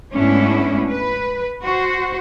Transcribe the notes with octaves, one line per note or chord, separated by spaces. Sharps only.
G#2 A3 B3 C#4 D4 E4
B4
F#4 C5